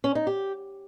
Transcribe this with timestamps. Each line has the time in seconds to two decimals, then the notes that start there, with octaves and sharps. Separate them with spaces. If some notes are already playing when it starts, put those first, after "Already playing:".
0.04 C#4
0.15 D#4
0.27 G4